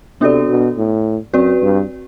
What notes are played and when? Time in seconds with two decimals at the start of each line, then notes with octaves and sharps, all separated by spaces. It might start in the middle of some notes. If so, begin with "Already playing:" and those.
0.21 C3 B3 D4 F#4 A4 D5
0.49 B2
0.78 A2
1.34 F#2 C4 F#4 B4 D5
1.62 G2